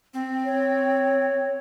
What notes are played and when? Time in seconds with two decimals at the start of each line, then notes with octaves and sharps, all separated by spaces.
0.14 C4
0.45 C#5